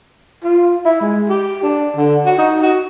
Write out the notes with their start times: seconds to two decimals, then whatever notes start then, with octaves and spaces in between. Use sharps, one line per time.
0.44 F4
0.85 E4
1.01 G#3
1.29 G4
1.63 D4
1.97 D3
2.26 F#4
2.38 D#4
2.63 F#4